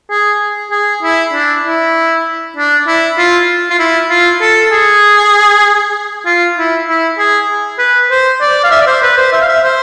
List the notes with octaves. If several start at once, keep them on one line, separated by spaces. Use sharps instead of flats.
G#4
G#4
E4
D4
E4
D4
E4
F4
F4
E4
F4
A4
G#4
F4
E4
E4
G#4
B4
C5
D5
F5
E5
D5
C5
B4
C5
E5
F5
E5
C5